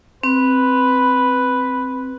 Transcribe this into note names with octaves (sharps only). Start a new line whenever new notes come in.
C4 B4